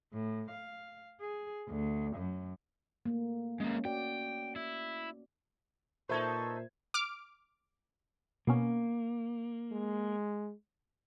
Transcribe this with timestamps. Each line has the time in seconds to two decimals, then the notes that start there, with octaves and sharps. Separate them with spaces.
0.12 A2
0.51 F5
1.21 G#4
1.69 D2
2.16 F#2
3.05 A3 A#3
3.60 G#3 A#3 C#4
3.85 F#4 D5 G5
4.56 E4
6.09 A#2 D#4 A4 B4 C5 E5 C#6 G#6
6.94 D6 F6 D7
8.47 B2 A#3 B3 C#4
9.72 G#3